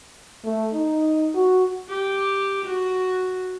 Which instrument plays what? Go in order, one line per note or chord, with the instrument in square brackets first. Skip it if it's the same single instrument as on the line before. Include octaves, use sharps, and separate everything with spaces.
[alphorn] A3
D#4
F#4
[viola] G4
F#4